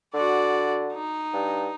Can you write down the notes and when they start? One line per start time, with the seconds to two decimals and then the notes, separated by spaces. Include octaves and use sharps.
0.14 D3 F#4 D5
0.93 D#4
1.33 G2